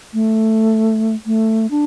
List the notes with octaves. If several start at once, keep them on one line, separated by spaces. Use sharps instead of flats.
A3
A3
D4